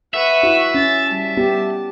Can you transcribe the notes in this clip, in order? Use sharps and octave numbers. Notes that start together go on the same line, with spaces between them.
B4 E5 F#5 C#6
E4 F#4
C#4 A6
G3 A5
B3 G4